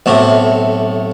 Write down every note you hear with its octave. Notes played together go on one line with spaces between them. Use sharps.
B1 A2 C3